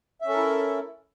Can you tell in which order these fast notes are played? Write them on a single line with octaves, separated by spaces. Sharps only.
E5 C#4 A4 A#4 E4